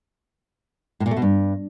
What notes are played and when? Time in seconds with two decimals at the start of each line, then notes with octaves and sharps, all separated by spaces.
1.00 A2
1.06 A#2
1.11 A3
1.17 B2
1.22 G2